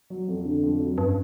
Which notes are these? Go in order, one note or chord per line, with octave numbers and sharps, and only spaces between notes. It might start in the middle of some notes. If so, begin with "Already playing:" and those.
F#3
F2
D3
F2
F#3
G2 C#4